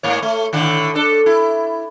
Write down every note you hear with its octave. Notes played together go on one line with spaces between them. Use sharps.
G#2 A#3 C#5
A3
A2 D3 D#3
D4 A4
E4